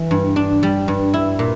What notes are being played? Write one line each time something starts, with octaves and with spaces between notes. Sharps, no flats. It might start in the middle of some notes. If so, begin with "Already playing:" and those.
Already playing: E3
G2
D4
G3
G2
E4
A#2